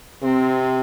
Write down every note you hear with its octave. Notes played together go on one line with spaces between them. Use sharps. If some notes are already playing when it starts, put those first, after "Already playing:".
C3 C4